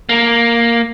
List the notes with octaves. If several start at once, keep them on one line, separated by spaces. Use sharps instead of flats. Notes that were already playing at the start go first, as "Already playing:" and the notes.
A#3